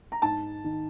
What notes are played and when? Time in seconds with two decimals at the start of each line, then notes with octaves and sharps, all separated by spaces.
0.12 A#5
0.22 G#2 A5
0.64 D#3